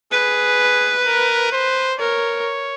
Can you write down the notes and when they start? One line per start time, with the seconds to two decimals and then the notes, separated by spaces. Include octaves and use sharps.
0.12 G#4 B4
1.06 A#4
1.52 C5
2.00 A#4 C#5